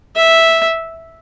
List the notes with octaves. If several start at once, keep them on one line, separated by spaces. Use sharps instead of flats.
E5